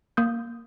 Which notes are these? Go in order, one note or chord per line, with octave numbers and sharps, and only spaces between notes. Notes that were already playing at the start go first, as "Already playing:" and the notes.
A#3 D#6 G6